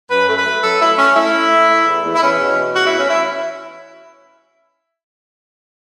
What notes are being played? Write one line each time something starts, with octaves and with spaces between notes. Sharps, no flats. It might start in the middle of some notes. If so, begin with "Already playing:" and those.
F#2 B4
A3
B4
A3
F#3 A4
A3 E4
A3 C#4
A3 E4
A3
A2
A3
E2
E2
E4
E2 C#4
B2
E2
A3 F#4
E4
E2
C#4
E4